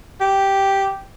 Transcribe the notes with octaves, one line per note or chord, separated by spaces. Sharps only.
G4